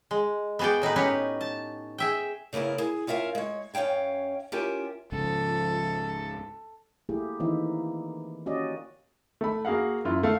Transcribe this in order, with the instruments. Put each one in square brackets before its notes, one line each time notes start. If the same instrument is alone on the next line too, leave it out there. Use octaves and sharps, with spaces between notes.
[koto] G#3
B3 F#4 G#4 D5 G5
A2 D#4 G#4 B4
C#4 D#4 G4 B4 C#5
A5
G#4 E5 G5
[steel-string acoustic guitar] C#3 A#3 B3 E4 A#4
G#4
C#4 F4 A#4 E5 F5
G#3 C#5
F#2 C#4 F5 G5 G#5
C#4 F4 G4 A#4 E5
[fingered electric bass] C#2 G#2 C#3 [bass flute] F3 [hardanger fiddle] A4
[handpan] A3 A#3 E4 G4 G#4
D#3 E3 A#3 C4 D#4 E4
A#3 C#4 F#4 G4 D5 D#5
[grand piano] A3 B5
A#3 F#4 G#4 F5 F#5
F#2 E4 F4
A3 F5